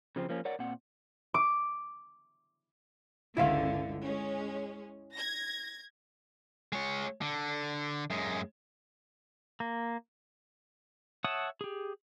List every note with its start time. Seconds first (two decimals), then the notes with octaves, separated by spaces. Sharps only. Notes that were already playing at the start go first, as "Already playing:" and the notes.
0.16 C#3 F3 C4
0.29 F3 A#3 C#4
0.45 A#4 C#5 D5 F#5
0.59 A#2 C4 F#5
1.34 D6
3.37 G1 C#2 D3 E4 E5 F5
4.03 G#3 C#4
5.12 G#6 A#6
6.72 G#3 C#5
7.21 D3
8.10 F#2 G#3
9.60 A#3
11.24 C#5 E5 F#5 A5 D#6
11.61 G4 G#4